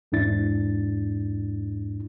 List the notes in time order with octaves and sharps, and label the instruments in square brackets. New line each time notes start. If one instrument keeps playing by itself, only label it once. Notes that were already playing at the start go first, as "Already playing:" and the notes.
[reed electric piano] E2 G#2 D4 E4 A6